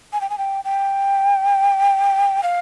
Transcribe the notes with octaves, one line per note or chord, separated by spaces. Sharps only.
G#5
G5
G#5
G5
G5
F5